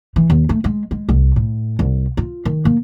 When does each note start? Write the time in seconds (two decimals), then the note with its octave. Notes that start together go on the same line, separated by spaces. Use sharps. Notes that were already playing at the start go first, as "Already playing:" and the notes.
0.16 E3
0.30 D#2
0.49 A3
0.64 G#3
0.91 G#3
1.09 C2
1.36 A2
1.79 C2
2.17 F4
2.45 D#3
2.65 A#3